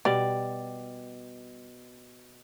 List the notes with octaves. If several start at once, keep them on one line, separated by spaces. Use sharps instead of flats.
B2 G3 D5